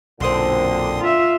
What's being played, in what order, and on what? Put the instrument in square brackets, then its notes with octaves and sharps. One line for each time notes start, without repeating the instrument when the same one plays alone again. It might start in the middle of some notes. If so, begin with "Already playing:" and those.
[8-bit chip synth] B1 C6 D#6 [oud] F#2 C4 [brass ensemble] A#2 D3
[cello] F4 E5